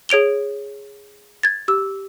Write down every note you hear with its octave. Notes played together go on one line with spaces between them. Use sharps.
G#4 C#5 D7 F7 G7
G#6 A6
G4 E6